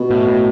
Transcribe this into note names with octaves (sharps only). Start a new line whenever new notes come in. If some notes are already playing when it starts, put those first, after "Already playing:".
Already playing: B2
A2
A2